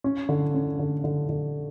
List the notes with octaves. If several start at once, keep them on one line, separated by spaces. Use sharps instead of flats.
C#4
D3
C#4
D3
D3
D3